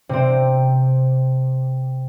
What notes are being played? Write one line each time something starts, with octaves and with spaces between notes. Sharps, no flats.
C3 C4